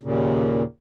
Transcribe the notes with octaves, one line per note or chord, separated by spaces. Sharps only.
D#2 A#2 C#3